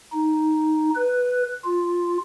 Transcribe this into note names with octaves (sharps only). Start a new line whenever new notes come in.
D#4
B4
F4